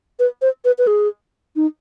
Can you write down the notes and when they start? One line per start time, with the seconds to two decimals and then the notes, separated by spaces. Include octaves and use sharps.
0.19 B4
0.42 C5
0.65 B4
0.78 B4
0.87 G#4
1.56 D#4